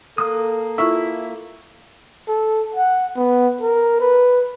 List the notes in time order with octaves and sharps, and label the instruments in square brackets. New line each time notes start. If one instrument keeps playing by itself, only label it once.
[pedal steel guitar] A#3 D#6 [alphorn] A4
[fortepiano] E4 [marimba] F4 C#6 E6
[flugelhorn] A4
F#5
B3
A#4
B4